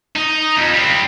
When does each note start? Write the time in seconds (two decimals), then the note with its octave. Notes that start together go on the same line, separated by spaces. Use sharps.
0.16 D#4
0.57 F2
0.74 G3 C4